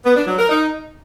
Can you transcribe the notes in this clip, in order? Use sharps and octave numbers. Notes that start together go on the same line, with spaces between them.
B3
D4
F#3
A#4
D#4